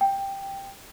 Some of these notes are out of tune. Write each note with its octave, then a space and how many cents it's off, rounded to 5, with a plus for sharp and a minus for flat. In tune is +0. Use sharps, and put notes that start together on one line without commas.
G5 +5